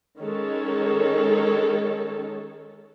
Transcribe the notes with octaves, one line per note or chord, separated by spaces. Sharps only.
D#3 G#3 C#4 A4 C#5